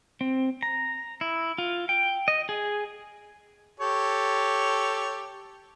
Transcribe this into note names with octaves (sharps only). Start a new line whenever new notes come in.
C4
A#5
E4
F4
G5
D#5
G#4
G4 A4 C#5